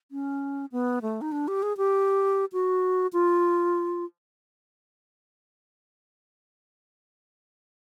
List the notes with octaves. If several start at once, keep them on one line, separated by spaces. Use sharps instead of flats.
C#4
B3
A3
D#4
D4
G4
G#4
G4
F#4
F4